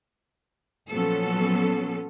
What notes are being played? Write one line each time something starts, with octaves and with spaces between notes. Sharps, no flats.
A#2 F3 F#3 B3 C#4 A4